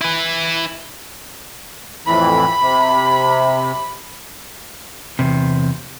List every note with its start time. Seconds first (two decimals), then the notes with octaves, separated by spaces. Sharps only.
0.01 E4 B4
2.06 F2 A2 E3 B5
2.60 C3
5.19 E2 C3